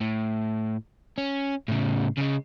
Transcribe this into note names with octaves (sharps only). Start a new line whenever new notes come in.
A2
C#4
A2 C#3
C#3 G#3